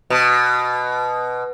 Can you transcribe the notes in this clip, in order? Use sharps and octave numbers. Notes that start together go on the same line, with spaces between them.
B2